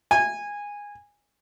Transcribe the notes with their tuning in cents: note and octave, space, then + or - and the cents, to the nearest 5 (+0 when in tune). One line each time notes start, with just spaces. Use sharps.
G#5 -15